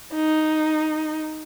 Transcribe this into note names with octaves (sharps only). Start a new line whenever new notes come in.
D#4